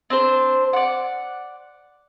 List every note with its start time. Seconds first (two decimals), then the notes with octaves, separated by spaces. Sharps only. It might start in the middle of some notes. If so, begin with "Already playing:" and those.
0.10 C4 D4 C5
0.73 D5 F#5